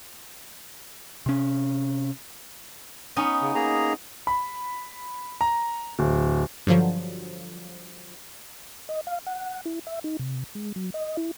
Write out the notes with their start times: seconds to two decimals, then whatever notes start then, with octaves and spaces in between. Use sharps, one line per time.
1.26 C3 C#4
3.16 B3 C#4 D#4
3.42 C#3
3.55 A#3 G#4 A#5
4.27 B5
5.41 A#5
5.99 D1
6.67 G2 D3 F3 F#3
8.89 D#5
9.07 F5
9.27 F#5
9.65 E4
9.87 E5
10.04 D#4
10.19 C3
10.55 G#3
10.76 F#3
10.94 D#5
11.17 E4